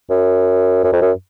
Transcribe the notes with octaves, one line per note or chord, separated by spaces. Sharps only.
F#2
F#2
F2
F#2